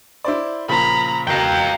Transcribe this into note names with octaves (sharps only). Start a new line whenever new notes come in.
E4 C5 D5
A#2 C#3 F3 A#5 B5
E1 C#2 F5 G5 A#5 A#6